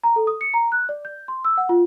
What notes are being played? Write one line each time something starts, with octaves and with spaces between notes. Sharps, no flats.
A#5
A4
D#6
C#7
A#5
F#6
D5
G6
C6
E6
F#5
F4